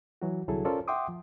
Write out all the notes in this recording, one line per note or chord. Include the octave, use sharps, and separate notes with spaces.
E3 F#3 F#4
C2 D3 F#3 E4 G#4 A4
C#4 F4 A4 A#4 C5 D5
E5 F#5 G5 C6 D6 D#6
F3